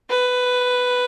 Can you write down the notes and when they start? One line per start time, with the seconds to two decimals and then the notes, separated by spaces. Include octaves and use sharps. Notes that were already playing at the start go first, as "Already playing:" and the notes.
0.10 B4